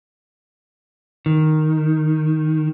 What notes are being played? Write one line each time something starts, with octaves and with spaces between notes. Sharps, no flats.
D#3